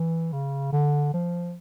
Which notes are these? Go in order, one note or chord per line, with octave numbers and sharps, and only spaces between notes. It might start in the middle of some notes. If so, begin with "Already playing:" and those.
Already playing: E3
C#3
D3
F3